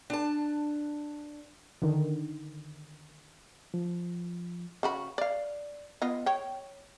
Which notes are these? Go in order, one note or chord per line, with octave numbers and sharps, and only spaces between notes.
D4 A5
D3 D#3
F3
C#3 F#4 B5
D5 F5
B3 F4 D#5
C#5 G5